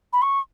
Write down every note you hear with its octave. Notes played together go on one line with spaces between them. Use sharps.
B5
C#6